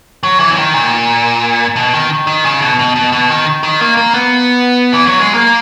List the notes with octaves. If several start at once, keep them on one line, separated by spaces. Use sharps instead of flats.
F#3
E3
C#3
D#3
A#2
B2
D#3
D#3
C#3
B2
B2
B2
B2
D#3
D#3
A#3
A#3
B3
E3
F#3
G#3
A#3